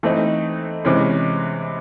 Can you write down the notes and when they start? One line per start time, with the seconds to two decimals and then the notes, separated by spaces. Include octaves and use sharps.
0.03 E3 A3 C4 D#4
0.85 C3 E3 G#3 C#4